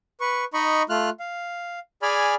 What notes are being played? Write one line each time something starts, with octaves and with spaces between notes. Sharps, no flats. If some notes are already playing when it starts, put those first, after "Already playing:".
B4 C#6
D#4 D#5 B5 C#6
A3 F4 F6 F#6
F5
G#4 D5 G#5 B5 F6